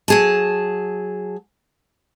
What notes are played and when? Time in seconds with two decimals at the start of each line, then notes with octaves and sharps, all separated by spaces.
0.08 F#3 G#4 A5